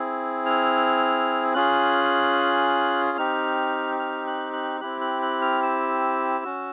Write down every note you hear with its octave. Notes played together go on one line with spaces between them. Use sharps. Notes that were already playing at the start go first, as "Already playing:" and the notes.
Already playing: C4 E4 G#4
F6
C#4 F4 G#4 F#6
C4 D#4 G4 F6
F6
F#6
F#6
C4 E4 G4 F#6
F#6
F#6
F6
E6
C#4 F#4